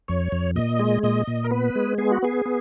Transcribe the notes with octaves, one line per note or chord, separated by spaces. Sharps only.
F2 C#5
F2
A#2 D#5
G#3
A#2 D#5
A#2
A#4
B3 B4
G#3
B3 G#4
F#4
B3 G#4
B3